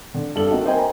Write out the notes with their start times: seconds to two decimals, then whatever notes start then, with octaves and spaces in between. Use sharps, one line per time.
0.14 D3
0.35 G2 A4 F#7
0.50 A#3 C4 D#4 F#4
0.64 A#4 C5 D#5 G5 G#5
0.79 A#5